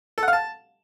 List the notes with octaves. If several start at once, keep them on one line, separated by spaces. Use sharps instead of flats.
A4
F#5
F5
A5